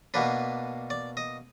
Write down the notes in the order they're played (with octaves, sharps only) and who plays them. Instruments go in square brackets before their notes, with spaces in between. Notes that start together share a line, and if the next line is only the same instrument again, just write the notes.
[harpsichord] B2 A#3 D4 B4
D5
D#5